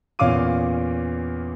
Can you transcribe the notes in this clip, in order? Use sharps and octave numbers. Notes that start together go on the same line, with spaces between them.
E2 A#2 C#4 F5 D6 D#7